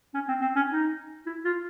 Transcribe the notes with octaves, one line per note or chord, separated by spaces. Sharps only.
C#4
C4
C4
C#4
D#4
E4
F4